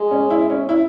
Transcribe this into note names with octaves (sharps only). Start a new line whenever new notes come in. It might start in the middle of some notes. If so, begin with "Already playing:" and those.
Already playing: G#3
C#4
E4
C#4
E4